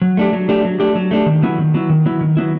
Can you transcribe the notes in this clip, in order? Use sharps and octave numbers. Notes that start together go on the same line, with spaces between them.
F#3
A3 D4 G4
F#3
A3 D4 G4
F#3
A3 D4 G4
F#3
A3 D4 G4
D#3
F#3 B3 E4
D#3
F#3 B3 E4
D#3
F#3 B3 E4
D#3
F#3 B3 E4